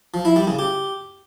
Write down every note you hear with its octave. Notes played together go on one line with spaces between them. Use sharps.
F3
E4
G3
C#3
G4